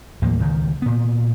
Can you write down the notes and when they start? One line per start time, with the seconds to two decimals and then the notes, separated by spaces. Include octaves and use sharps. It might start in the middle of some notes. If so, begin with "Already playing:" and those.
0.22 D#2 A2 F3 A#3
0.40 C#2 D#3
0.82 A#2 B3